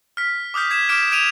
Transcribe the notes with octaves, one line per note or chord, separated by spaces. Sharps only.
F6 B6
D6 D#6 F6 G6 B6
G#6 B6 E7
D6 F6 B6 D7 E7
G#6 D7 D#7 F7